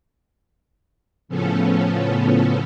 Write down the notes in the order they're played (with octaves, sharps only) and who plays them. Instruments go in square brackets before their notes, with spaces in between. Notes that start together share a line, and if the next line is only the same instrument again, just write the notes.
[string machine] A2 C#3 F3 B3 C#4 A4